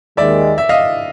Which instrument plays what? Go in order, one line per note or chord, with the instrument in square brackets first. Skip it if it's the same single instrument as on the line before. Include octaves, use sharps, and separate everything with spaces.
[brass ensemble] D#2 D#3 G#3 [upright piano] D5 E5
[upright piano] E5
D#5 F5